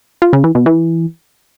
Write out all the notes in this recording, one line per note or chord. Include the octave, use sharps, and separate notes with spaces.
F4
C#3
E3
B2
E3